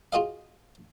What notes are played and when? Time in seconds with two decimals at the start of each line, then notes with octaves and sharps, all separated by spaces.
0.12 F4 F#4 G#4 D#5 F5